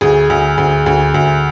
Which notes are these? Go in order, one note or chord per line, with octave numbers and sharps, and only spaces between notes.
D2 G#4
D2
D2
D2
D2